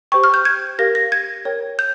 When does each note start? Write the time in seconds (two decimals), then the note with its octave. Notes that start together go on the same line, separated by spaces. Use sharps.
0.12 G4 C5 G5 C#6
0.24 F6
0.34 G6
0.45 G#6
0.79 G4 A#4 F5 A#6
0.95 A#6
1.12 G#6
1.45 A#4 C#5 G5
1.79 G6